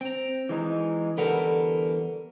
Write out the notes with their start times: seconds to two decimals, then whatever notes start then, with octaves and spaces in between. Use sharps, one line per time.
0.01 C4 G5 A#5
0.49 E3 G#3 D#4
1.17 E2 D3 G3 A#4 B4 F#5